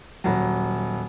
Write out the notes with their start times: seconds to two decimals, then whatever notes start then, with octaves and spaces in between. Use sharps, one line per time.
0.24 D#1 F#3